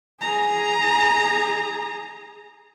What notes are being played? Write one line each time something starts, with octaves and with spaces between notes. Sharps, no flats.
G#4 A#5